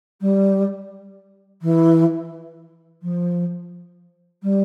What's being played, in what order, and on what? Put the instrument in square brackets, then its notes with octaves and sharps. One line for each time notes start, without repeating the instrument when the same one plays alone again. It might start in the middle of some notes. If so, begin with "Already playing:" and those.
[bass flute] G3
E3
F3
G3